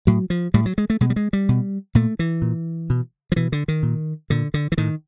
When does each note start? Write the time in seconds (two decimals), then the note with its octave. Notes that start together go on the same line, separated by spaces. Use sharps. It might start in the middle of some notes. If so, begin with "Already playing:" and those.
0.07 A2 F#3
0.30 F3
0.54 A2 G3
0.66 F#3
0.78 G#3
0.90 A3
1.01 B2 G#3
1.10 G3
1.16 G#3
1.33 G3
1.49 B2
1.95 A#2 A3
2.19 E3
2.42 A#2
2.90 B2
3.32 F3
3.36 B2 E3
3.52 D3
3.68 D#3
3.83 A#2
4.30 A#2 D3
4.54 D3
4.72 E3
4.78 A2 D#3